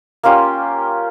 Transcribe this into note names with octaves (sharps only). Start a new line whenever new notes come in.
A#3 C#4 F4 G4